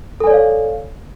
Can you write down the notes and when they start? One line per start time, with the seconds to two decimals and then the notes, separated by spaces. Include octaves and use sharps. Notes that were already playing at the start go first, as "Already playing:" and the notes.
0.20 A4
0.24 G#5
0.27 D5
0.30 C#5
0.34 F5